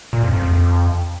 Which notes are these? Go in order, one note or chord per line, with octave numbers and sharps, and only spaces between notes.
A#2
F2
F2
F2
F2